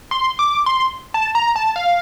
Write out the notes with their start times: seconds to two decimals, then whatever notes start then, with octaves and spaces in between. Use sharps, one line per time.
0.11 C6
0.39 D6
0.66 C6
1.14 A5
1.35 A#5
1.56 A5
1.76 F5